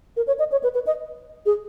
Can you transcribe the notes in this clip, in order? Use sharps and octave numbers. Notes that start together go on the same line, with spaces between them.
A#4
C#5
D#5
C#5
B4
B4
D#5
G#4